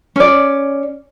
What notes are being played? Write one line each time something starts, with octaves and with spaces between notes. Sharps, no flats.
C#4 D5